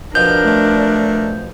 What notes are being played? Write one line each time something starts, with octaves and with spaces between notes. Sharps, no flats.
F2 B2 F3 D4 A#4 G6
A3